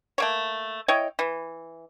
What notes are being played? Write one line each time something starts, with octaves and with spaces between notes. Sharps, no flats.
A3 A#3 C#5
E4 C#5 D#5 G5
E3